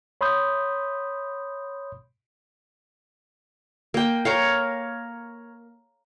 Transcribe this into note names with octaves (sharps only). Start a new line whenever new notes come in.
C#5 B5 C6 D#6 G6
A#3 G5
A#4 C#5 F5